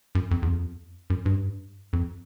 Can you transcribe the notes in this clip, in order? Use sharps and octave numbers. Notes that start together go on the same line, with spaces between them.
F#2
F2
E2
F2
F#2
G2
F2